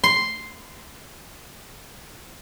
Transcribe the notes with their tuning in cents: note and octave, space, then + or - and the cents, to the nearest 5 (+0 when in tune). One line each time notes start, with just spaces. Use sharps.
C6 +0